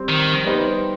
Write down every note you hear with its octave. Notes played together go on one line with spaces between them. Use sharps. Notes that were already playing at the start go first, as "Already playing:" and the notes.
Already playing: G3 C4 G4 C5
D#3
G3 B3 D#4 G4 C5